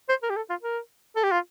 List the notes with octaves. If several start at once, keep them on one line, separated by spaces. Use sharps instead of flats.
C5
A#4
G4
A4
F4
A#4
A4
G4
F4